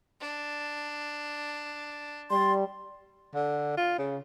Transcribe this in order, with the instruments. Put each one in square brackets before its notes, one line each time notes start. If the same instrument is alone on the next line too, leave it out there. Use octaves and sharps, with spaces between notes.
[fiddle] D4
[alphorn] G3 [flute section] D5 C6
[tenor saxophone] D3
F4
C#3